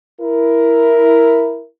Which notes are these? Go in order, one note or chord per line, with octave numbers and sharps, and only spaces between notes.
E4 A#4